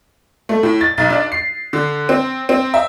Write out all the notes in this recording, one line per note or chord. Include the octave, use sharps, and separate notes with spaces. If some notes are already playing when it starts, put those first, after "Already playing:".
A3
A2
A6
B1
D4
C7
D3
C4
C4
E5